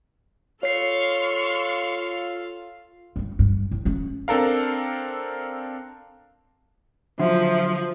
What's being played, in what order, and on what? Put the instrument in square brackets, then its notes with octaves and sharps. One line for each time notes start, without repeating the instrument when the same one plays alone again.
[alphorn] F4 [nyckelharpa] A4 F5 [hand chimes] C#5 C7 [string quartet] C6 C#6 F6
[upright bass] G2 G3
G2
A2
A3 C#4
[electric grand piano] C4 D4 A4 A#4 F5
[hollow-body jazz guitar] D3 F#3 [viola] F3 [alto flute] E5